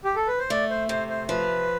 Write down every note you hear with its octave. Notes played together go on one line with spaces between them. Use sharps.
G4
A4
B4
C5
A3 D5
C5
C3 C5
C5
F3 B4